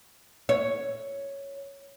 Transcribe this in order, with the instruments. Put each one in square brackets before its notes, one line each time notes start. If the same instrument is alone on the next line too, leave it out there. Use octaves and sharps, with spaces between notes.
[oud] C#5